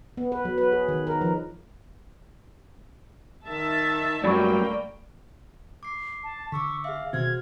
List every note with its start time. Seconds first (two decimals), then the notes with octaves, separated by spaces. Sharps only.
0.17 B3
0.32 B4
0.45 F#3
0.58 B4
0.72 G#4
0.88 D#3
1.07 A#4
1.21 F3
3.46 D#3 E5 A5
4.24 G2 F#3 A3 A#3 D5 G5 B5 C#6
5.83 D6 C7
6.24 A5
6.52 D3 C#6 D6 E6 B6
6.84 G#4 E5 F5
7.13 B2 D#3 C4 F#4 C5 F6 G#6